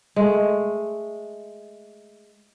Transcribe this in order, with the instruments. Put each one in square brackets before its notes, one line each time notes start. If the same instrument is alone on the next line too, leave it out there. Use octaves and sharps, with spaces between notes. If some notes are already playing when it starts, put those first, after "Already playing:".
[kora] G#3 A3